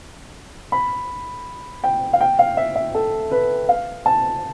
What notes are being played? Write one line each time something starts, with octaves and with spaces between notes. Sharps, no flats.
B5
G5
F5
G5
F5
E5
E5
A4
B4
F5
A5